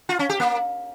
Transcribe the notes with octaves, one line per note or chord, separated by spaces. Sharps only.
F4
C#4
G4
A#3